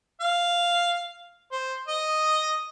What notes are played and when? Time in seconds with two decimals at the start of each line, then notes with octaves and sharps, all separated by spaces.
0.21 F5
1.52 C5
1.88 D#5